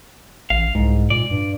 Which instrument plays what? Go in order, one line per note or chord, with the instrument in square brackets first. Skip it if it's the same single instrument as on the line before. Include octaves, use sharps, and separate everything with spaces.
[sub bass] A1 [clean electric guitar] F5
[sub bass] C2 [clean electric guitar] G#2
[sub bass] A#2 [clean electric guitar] D5
[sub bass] G2